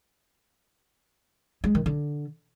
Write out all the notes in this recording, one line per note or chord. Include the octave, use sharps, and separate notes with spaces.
G#3
D#3
D3